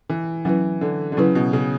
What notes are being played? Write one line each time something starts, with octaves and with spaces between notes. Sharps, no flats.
E3
E3 F#3 C#4 E4 B4
D3
D3
C#3 F#3 C#4 E4 B4
B2
C#3